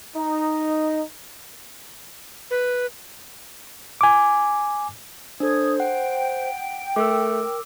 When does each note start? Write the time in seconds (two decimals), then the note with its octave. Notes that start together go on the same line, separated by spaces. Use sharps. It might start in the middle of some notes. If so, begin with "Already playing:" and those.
0.15 D#4
2.51 B4
4.01 G#5 D6
5.40 D4 A4 C5 D#6 G#6
5.80 F#5 G5
6.96 A3 A#4 D6 E6